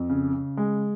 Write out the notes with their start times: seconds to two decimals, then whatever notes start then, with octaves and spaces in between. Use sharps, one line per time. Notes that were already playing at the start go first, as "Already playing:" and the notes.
Already playing: F2
0.09 C#3
0.33 C#3
0.57 G#3